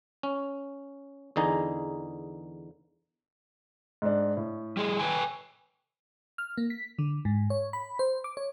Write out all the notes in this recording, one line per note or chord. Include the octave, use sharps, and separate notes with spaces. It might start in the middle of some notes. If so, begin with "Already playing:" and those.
C#4
E2 D3 D#4 G#4 A#5
G#2 D4
A2
G3 G#4
B4 G5 G#5
F6
A#3
B6
D3
G#2
C#5
B5
C5
D6
C#5